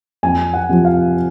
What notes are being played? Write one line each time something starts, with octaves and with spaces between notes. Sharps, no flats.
F2 G#5
F#5
C3 F3
F5